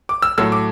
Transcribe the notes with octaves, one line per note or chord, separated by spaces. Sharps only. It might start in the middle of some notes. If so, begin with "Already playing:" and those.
D6
E6
A2 F#3 A3 E6
D6